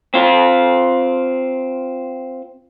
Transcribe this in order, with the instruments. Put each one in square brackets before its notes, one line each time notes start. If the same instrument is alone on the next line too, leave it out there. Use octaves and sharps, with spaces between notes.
[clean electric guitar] C4 F4